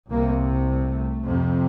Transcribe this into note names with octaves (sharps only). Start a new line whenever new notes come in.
C2 C3 A#3
A3
F2 C3